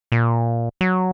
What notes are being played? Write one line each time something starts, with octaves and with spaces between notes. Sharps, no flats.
A#2
F#3